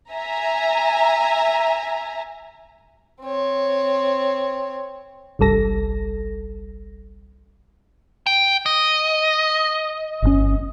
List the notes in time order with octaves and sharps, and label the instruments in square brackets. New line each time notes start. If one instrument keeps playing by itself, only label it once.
[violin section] E5 G#5 A#5
[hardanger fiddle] C4 C#5
[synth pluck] G1 C2 G3 A4 A#6
[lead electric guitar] G5
D#5
[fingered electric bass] G1 A#2 C#4